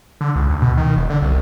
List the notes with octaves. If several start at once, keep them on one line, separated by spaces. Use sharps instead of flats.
D3
C#2
D2
B2
D#3
E1
D3
C2